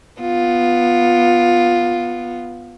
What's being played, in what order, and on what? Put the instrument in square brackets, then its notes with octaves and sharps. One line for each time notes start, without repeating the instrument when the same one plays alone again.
[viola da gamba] B3 F4